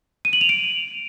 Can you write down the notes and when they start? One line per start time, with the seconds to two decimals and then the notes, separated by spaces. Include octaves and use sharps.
0.25 D#7
0.33 F#7
0.41 F7
0.49 D7